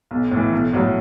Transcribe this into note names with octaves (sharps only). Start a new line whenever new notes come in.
B1
A2
E3
B1
A2 F#3